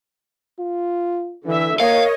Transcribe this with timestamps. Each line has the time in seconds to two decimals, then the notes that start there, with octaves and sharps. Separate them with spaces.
0.59 F4
1.46 D3 E3 E5
1.80 A#3 A#4 C#5 D#5 F5